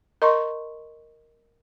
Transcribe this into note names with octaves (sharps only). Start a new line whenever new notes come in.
A#4 D#5 A#5 C6 C#6